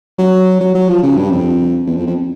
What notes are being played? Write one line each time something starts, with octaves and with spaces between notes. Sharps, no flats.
F#3
F#3
F#3
F3
C#3
G2
F2
E2
F2
F2